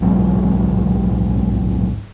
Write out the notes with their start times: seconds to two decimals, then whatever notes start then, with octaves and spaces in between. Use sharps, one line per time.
0.01 D1 B1 G#2 F#3